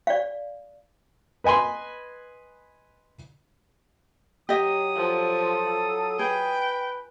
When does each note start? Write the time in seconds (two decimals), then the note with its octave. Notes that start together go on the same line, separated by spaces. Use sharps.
0.07 D5 F5
1.44 B4 D#5 G#5 B5 C6
4.49 F#3 G4 D#5 D#6
4.96 F3 A4
6.19 G#4 B4 G5